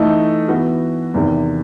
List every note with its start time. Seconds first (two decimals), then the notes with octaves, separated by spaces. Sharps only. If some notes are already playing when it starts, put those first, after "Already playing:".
Already playing: E3 A3 D#4 A4
0.48 E3 B3 F#4
1.14 E2 C3 D#3